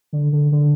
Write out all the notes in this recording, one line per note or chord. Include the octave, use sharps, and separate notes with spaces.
D3
D3
D3